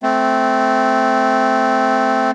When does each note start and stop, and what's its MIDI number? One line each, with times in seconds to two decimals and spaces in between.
0.03 2.31 57
0.03 2.31 60